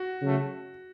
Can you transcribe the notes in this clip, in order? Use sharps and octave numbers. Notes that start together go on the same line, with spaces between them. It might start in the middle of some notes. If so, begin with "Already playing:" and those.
Already playing: F#4
C#3 F#3 A3